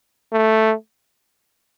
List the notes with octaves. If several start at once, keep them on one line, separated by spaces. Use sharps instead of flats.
A3